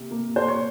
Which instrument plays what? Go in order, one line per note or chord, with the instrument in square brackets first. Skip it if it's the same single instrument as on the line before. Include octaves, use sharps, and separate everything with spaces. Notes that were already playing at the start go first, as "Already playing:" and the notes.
Already playing: [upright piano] C3 A#3
A#3
A#3 C5
C#5